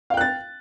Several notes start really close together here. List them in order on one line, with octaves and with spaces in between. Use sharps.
F5 G5 F#6 A6